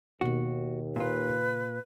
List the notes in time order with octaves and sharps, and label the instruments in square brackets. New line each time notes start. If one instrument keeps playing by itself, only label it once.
[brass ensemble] D#2 [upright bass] B2 B3 [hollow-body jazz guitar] F#4
[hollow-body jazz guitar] A#2 F4 [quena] B4
[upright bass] C#3